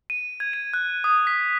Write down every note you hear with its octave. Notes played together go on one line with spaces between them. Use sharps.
D#7
G#6
D#7
F#6
D#6
B6